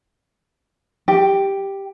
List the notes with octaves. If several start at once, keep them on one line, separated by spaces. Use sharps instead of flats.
G4